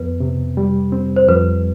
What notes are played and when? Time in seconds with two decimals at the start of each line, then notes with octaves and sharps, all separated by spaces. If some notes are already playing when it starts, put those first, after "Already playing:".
Already playing: F2 B3 B4
0.20 C3
0.57 G3
0.92 C4
1.16 C5
1.28 F2 B4